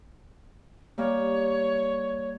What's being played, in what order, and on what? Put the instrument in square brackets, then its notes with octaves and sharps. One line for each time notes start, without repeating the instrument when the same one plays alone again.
[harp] G3 A#3 [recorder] C#5